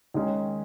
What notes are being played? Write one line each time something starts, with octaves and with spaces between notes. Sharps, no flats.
D#2 D#3 G#3 C#4